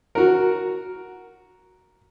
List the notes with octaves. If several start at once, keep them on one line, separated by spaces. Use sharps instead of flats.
F#4 A#4